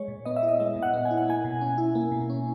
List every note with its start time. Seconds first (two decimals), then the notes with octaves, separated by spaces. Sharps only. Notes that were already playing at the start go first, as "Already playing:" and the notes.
Already playing: G#3 C#5
0.08 A#2
0.25 B3 D#5
0.36 E5
0.43 E4
0.48 D#5
0.60 G#3 E5
0.76 A#2
0.83 F#5
0.93 B3
1.05 G#5
1.11 E4
1.17 F#5
1.28 A#3 G#5
1.44 B2
1.61 C#4
1.78 E4
1.95 A#3
2.11 B2
2.30 C#4